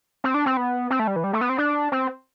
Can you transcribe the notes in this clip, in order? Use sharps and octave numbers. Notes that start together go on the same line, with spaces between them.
C4
D4
C4
B3
C4
A3
G3
E3
G3
A3
B3
C4
D4
C4